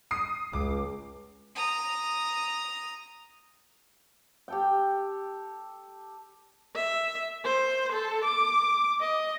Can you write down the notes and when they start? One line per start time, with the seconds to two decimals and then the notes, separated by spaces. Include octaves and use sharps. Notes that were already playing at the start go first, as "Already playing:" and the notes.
0.11 D#6 C7
0.53 C#2 D6
1.55 A#5 D#6
4.48 G4 A4 G5
6.75 E5
7.44 C5
7.92 A4
8.24 D6
9.00 D#5